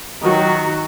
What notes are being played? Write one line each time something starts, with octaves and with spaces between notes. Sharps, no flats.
D#3 F#3 F#4